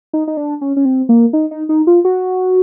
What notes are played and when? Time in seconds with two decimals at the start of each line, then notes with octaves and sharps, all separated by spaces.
0.13 D#4
0.27 D#4
0.37 D4
0.61 C#4
0.77 C#4
0.85 C4
1.09 A#3
1.33 D#4
1.51 D#4
1.69 D#4
1.87 F4
2.05 F#4